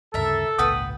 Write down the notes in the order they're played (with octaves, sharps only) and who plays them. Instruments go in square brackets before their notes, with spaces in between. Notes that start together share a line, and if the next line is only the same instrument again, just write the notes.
[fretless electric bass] D2 G2 C#3 [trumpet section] A4 [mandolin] A#4 E5
[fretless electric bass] G#1 C#2 A#2 [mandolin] B4 F#5 G5 [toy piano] D#6